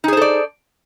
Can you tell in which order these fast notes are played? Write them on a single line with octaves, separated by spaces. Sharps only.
D#4 G#4 C5 A4 D5